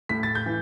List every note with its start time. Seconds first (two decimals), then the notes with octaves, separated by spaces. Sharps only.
0.09 A2 B6
0.23 A6
0.35 G6
0.46 E3